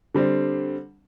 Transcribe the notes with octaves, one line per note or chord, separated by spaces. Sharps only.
D3 G3 C4